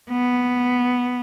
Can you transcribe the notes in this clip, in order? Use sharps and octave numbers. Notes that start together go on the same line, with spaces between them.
B3